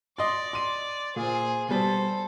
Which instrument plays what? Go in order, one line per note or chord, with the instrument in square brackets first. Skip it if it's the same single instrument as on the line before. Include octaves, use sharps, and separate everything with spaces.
[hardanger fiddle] D5 [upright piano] D#5 C6
[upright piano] C6 D#7
[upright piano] A#2 [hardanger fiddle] G#4 C5
[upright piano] B2 G3 [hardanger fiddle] A4 C5